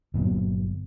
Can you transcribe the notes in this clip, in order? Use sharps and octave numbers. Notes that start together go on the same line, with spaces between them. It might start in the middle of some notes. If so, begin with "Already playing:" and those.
G1 A#2 F#3 B3